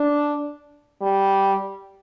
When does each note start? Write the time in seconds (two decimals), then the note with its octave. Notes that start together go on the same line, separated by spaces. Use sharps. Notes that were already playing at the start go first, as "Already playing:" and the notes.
Already playing: D4
1.02 G3